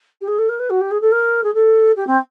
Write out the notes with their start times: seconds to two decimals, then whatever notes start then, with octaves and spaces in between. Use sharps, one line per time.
0.21 G4
0.28 G#4
0.38 A4
0.49 A#4
0.60 B4
0.70 F#4
0.81 G4
0.91 G#4
1.01 A4
1.12 A#4
1.44 G#4
1.54 A4
1.96 G4
2.07 C4